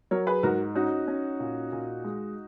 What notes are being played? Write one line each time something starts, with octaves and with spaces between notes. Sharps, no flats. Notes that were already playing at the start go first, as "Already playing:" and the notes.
F#3 A#4 C#5
G#4 B4
G#2 F#4 A#4
C#4 D#4 F#4
C#4
A#2
A#2
G#3